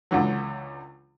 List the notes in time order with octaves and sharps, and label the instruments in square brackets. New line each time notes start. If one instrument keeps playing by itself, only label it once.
[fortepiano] C#2 D3 E3 F#3